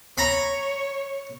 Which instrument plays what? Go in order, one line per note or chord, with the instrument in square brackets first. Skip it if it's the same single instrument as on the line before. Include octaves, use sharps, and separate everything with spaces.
[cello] C#5 [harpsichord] A#5 B5